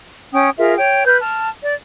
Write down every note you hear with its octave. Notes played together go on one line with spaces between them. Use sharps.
C#4 G5 D#6
F4 G#4 A#4 E5
C#5 G5
B4 F6 G6
A5 F6
D5